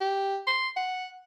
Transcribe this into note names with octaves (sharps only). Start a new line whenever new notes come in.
G4
C6
F#5